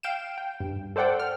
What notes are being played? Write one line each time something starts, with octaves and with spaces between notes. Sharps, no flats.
F5 G5 D7 E7
G5
G2
A4 C5 D5 F#5 G5
F6